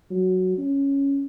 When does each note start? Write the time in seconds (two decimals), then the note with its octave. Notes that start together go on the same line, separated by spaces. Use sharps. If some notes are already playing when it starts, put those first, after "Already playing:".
0.11 F#3
0.58 C#4